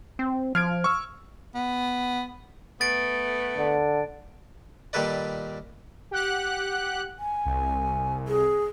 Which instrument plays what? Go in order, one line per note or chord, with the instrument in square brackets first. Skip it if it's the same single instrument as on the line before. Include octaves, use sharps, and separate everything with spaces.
[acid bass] C4
[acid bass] F3 [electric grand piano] F6 G#6 D7
[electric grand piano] C#6 E6
[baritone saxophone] B3
[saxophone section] A3 B3 [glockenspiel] A6 D7
[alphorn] D3
[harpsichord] A#2 D#3 G3 A4 B4 D5
[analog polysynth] G4 F#5 F#6
[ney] G#5
[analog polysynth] C2
[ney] G#4